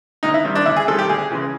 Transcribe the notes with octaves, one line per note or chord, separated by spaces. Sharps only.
D2 D#4
E4
C3 D#3 G3
D4
D2 E4
G#4
C3 D#3 G3 A4
G4
D2 G#4
C#3 E3 G#3